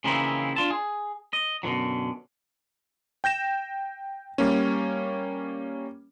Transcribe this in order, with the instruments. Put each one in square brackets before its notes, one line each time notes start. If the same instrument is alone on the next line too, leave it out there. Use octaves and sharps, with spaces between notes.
[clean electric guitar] C#3 E3 A#3 C4 D#4 E4
D4 F4 A5
G#4
D#5
F#2 B2 D3 E3 F#3
[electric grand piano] G5 G6 A#6 E7
G3 A#3 C#4